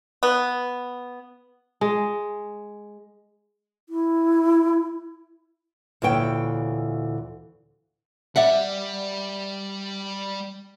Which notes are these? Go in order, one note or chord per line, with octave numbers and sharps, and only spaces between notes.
B3
G#3
E4
D2 A#2 E3 C#5 G5
G3 D5 E5 F#5